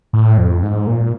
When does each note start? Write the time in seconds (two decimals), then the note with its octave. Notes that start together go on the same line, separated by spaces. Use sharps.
0.13 A2
0.38 F2
0.63 G#2
0.87 A#2